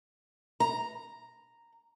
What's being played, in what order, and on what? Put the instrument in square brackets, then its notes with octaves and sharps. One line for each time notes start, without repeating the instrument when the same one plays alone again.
[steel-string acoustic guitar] A#5